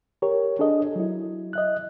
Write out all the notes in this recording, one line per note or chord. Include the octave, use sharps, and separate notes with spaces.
G4 A#4 C#5
D4 G#4 A4 D#5
F#3 E4
D#5 E5 F#6